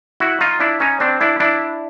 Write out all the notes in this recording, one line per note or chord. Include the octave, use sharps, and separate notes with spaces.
E4 F#4
D#4 F4
D4 E4
C#4 D#4
C4 D4
D4 E4
D4 E4